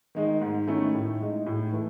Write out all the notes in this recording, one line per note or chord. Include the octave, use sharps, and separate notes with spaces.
D#3 G#3 D#4
G#2
D#3 A3 C#4 E4
A2
G#3 D#4
A2
E3 A3